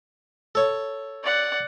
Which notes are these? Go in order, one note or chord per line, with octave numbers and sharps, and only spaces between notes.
A4 C#5
D5 F#5